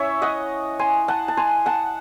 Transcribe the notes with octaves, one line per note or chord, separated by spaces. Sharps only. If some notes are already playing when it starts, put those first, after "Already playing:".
Already playing: C#4 E4 C#5 E5
D#5 F#5
G#5 C6
F#5 A5
A5
G#5 C6
F#5 A5